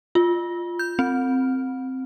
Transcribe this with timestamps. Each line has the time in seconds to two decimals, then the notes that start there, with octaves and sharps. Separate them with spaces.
0.15 F4
0.79 G6
0.99 C4